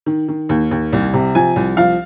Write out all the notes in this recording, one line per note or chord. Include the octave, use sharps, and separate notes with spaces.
D#3
D#3
D#2
D#2
C2
C3
F3 G#5
C2
F3 F5